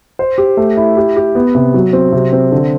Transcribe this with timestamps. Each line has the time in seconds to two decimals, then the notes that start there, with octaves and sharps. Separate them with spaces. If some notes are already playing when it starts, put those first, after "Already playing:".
0.19 C5
0.38 G4
0.57 A3
0.77 E4
0.97 G4
1.17 G4
1.35 B3
1.55 C3
1.74 F#3
1.93 C4
2.12 C3
2.32 C4
2.52 D3